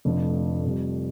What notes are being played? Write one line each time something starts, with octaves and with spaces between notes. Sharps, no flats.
F1 F2 D3 F3 A3
F2 C3 G3